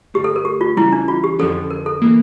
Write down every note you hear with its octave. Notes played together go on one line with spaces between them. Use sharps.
G2 D3 A3 G4
A4
A#4
G4
F4
C#3 E3 G3 C#4 E4
D4
F4
G4
F2 D3 F3 C#4 A4
A#4
A4
E3 A#3